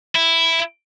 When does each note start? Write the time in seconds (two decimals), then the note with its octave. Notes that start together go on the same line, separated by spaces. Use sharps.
0.15 E4